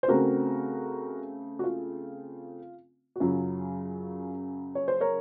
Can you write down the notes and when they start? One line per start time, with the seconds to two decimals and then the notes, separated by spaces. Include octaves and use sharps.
0.03 C5
0.08 C#3 A3 C4 F#4 A#4
1.59 F#4
1.64 F4
3.16 F#4
3.20 F#2 C#3 F#3 F4
4.75 C#5
4.88 C5
5.01 A#4 C#5